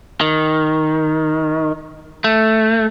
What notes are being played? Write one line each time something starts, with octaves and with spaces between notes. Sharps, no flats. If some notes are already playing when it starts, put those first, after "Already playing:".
D#3
A3